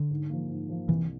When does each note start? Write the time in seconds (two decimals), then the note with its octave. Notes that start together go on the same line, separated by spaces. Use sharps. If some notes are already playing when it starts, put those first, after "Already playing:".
Already playing: D3
0.11 G#2
0.30 F3 A#3
0.49 G#2
0.69 F3 A#3
0.89 C2 E3